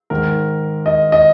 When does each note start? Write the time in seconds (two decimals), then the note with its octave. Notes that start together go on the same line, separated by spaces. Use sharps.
0.10 G#2 D#3 A#4
0.86 D#5
1.12 D#5